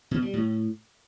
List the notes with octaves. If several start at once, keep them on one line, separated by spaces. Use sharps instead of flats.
B2
G3
A2